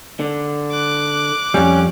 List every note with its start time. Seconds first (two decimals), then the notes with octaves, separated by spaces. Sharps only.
0.20 D3
0.71 D6 F#6
1.54 F2 G3 C#4